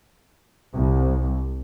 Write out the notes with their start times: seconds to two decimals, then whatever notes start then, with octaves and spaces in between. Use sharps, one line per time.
0.74 C2